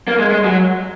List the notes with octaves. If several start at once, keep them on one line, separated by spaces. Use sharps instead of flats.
A#3
G#3
G#3
F#3